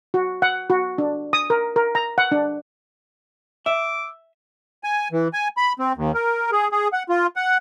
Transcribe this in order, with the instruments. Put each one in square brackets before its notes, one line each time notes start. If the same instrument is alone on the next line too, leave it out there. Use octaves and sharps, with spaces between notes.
[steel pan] F#4
F#5
F#4
D4
D#6
A#4
A#4
A#5
F#5
D4
[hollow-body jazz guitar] E5 [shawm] D6 [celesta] E6
[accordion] G#5
E3
G#5
B5
C4
D#2
A#4
G#4
G#4
F#5
F4
F#5